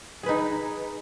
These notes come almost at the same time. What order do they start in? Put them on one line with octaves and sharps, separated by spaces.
G#4 B4 D#4